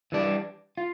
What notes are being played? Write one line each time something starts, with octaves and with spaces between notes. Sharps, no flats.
E3 G3 D4
F4